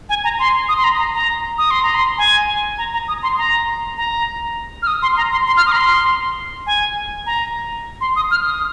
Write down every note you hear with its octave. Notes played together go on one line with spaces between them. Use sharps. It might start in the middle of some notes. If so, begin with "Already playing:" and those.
G#5
A#5
C6
D#6
C6
A#5
A#5
A#5
D#6
C6
A#5
C6
G#5
A#5
A#5
D#6
C6
A#5
A#5
F6
D#6
C6
A#5
C6
C6
F6
D#6
A#5
C6
G#5
A#5
C6
D#6
F6
D#6